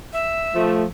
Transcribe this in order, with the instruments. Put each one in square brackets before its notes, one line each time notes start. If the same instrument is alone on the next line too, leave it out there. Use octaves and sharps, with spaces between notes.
[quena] E5
[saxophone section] F3 A3